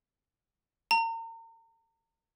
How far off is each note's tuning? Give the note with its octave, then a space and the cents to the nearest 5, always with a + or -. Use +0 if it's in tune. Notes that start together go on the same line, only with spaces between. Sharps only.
A#5 -40